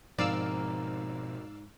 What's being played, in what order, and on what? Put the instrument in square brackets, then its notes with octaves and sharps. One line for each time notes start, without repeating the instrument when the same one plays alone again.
[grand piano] G#2 [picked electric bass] B2 F3 C4 [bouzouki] A#3 [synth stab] D5 F5 E6